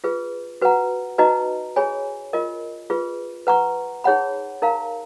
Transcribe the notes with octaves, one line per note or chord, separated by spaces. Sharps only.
F4 G#4 B4
F#4 B4 F#5 A#5
D#4 F#4 B4 D#5 A#5
G#4 C#5 G#5 B5
F4 A#4 D#5
F4 G#4 B4
B4 F#5 A#5 C#6
D#4 G#4 C#5 F#5 B5
D#4 A#4 F5 A#5